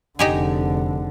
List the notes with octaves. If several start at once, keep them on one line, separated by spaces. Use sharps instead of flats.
F1 D3 D#4 G4 G#4